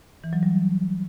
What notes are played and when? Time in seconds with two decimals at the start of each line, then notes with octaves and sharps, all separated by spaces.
0.24 E3
0.33 F#3
0.43 G3